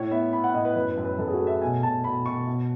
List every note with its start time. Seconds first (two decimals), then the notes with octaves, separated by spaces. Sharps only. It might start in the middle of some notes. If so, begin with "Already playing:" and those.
Already playing: A2 C#5
0.11 B3 E5
0.33 B3 B5
0.44 F#5
0.54 A2 D#5
0.65 B4
0.76 F#2 B4
0.90 B4
0.98 F#2
1.05 B4
1.18 F#2 A4
1.28 G#4
1.33 F#4
1.40 A3
1.47 E5
1.61 B2 G#5
1.83 B2 A5
2.04 B2 B5
2.26 B2 C#6
2.47 B2